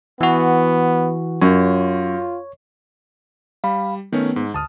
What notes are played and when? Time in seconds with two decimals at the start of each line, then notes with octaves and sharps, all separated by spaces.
0.21 E3 B3 F#4
1.42 F#2 F4 C#5
3.64 G3 F5 B5
4.13 D#3 A3 B3 C#4
4.36 G#2
4.54 D2 A5 D#6 F6